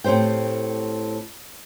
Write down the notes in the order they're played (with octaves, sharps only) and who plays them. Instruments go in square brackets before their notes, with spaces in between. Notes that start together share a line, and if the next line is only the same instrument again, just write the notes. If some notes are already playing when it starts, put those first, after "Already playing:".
[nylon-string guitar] A2 C4 G4 C5 G5